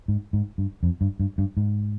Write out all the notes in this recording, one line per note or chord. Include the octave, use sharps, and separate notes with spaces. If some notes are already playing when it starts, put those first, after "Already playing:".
G#2
G#2
G2
F2
G2
G2
G2
G#2